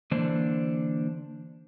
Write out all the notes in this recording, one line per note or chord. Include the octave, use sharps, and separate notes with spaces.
D3 E3 A#3 D4 C5